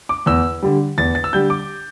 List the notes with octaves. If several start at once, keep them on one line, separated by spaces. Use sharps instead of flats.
D6
E2 E6
D3 G3
E2 A6
A6
E6
D3 G3 G6
D6